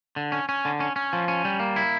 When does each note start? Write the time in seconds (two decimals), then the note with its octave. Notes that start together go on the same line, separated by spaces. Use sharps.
0.16 D3
0.32 C#4
0.49 C#4
0.65 D3
0.80 C#4
0.96 C#4
1.13 F3
1.28 C#4
1.45 G3
1.60 A#3
1.76 E4